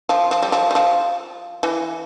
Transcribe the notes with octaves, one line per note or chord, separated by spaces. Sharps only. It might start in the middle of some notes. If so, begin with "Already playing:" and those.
F3
F3
G3
F3
G3
F3
E3